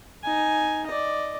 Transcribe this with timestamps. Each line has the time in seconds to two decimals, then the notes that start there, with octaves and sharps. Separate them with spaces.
0.24 D#4 G#5
0.87 D5 D#5